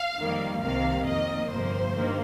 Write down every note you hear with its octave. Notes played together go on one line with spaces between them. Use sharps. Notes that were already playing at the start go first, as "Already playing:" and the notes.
Already playing: F5
F2 D#3 G3 A#3
C2 C3 D#3 A#3 F5
F2 D#3 A#3 D#5
G1 F2 C3 F3 A#3 C5
G2 D#3 A#3